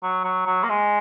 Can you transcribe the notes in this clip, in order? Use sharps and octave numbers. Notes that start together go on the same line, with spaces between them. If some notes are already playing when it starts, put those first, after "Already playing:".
F#3
F#3
F#3
A#3
G#3